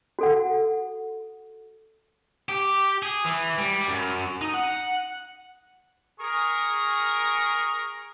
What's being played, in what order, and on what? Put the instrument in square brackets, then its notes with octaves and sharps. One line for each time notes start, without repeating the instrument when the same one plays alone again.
[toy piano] F#4 A4 F#5
[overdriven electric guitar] G4
G#4
E3
G3
F#2
D#4
F#5
[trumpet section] G#4 A#4 C#6 D#6